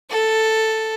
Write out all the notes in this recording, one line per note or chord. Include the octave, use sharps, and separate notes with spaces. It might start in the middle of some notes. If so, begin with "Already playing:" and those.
A4